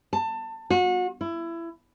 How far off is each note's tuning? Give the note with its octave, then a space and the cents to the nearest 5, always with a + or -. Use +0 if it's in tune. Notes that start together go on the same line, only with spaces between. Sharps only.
A5 +25
F#4 -30
E4 +25